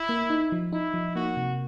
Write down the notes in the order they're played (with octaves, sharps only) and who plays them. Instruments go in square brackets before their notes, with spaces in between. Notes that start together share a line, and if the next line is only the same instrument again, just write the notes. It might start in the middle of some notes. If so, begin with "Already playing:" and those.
Already playing: [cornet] E4
[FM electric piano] A#3
D#4
F3
[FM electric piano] D#4 [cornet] E4
[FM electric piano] F3
[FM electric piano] A#3 [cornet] F#4
[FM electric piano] C3